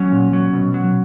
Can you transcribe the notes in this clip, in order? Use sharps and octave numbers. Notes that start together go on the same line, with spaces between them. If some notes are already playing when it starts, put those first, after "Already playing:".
Already playing: F#3 C#4
A#2
F#3
B2
F#3